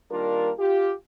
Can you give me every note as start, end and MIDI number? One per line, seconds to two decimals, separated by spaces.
0.11 0.51 51
0.11 0.51 55
0.11 0.51 58
0.11 0.51 62
0.11 0.51 65
0.11 0.51 70
0.59 0.92 65
0.59 0.92 67